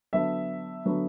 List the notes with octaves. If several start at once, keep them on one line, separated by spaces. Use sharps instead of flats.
D3 F#3 B3 D4 E5
D3 F#3 B3 D4